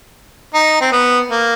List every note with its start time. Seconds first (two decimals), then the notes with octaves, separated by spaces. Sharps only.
0.54 D#4
0.81 C4
0.92 B3
1.31 A#3